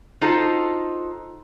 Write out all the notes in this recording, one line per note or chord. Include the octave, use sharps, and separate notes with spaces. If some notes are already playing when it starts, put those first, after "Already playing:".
D#4 F4 F#4 A4 C5 D#5